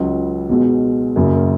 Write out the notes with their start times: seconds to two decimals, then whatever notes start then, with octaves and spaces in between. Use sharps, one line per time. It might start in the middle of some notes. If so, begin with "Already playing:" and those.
Already playing: C#2 C#3 F#3
0.49 B1 B2 G#3
1.16 F#1 F#2 C#3